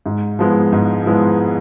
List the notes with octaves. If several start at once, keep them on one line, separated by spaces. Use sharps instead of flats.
G#2
F3 G#3 B3 E4
G#2
F3 G#3 B3 E4